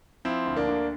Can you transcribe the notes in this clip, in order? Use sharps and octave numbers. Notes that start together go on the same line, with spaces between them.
F3 C4 E4
D2
A#3 D4
D3